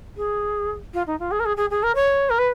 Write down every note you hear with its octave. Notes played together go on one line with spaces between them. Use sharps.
G#4
F4
D#4
F4
G#4
A#4
G#4
G#4
G#4
A#4
C#5
A#4
B4